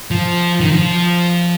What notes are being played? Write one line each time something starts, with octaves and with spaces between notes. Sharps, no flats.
F3
D#3
F3